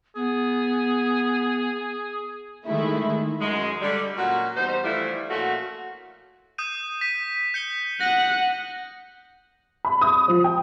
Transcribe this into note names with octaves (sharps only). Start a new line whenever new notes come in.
B3 G#4
D#3 G#3 A3 E4
F#2 G#3
D3 G3
A#2 F#3 C#4 F#4
E2 G3 D#4 C5
D3 E3 F3 G3 A3 E4
A#2 F3 A3 C#4 F#4
D#6 G6 D#7
B6 D#7
G6 C#7 G7
F#5 F#6 A#6 D#7
B5
D#6
F3
G5